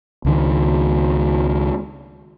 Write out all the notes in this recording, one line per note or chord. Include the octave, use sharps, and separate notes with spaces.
C#2 D#3